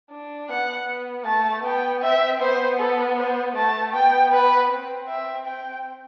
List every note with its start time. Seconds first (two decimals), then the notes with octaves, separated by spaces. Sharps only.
0.11 D4
0.50 B3 F#5
0.87 B3
1.26 A3 A5
1.64 B3 G5
2.02 C4 E5
2.40 B3 C5
2.79 A4
3.17 C5
3.55 A3 A5
3.93 B3 G5
4.32 B4
4.69 C4
5.08 E5
5.46 G5